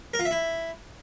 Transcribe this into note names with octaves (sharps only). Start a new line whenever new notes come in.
A#4
F4
E5
E4